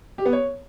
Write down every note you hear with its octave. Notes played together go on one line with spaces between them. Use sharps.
G4
B3
C#5